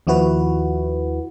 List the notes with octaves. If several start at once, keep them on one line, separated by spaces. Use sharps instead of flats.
D#2 F3 E4 F#4 B4